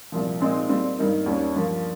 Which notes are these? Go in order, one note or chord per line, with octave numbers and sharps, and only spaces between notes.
C2 A#2 F3
A#2 G#3 C4 D#4
A#2 G3 C4
G2 D#3 A#3 D#4
D#2 D#3 G3 C#4
G2 F3 A#3